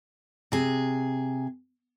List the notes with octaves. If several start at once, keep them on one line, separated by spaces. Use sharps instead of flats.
C3 G#4